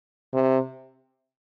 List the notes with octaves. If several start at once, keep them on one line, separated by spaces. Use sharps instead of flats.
C3